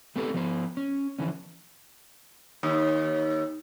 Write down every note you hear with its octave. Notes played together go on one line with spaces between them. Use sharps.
A3 B3 C4 G4 A4 B4
F3 B3 C5
C#4
D3 E3 F3 C#4
D#2